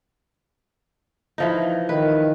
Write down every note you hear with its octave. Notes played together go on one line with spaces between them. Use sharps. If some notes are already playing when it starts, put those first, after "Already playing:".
E3 F3 D#4
D#3 B4